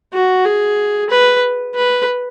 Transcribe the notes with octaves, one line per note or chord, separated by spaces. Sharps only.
F#4
G#4
B4
B4